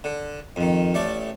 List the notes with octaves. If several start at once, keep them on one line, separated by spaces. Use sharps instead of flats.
D3
F2 D#3
A1 A3 D5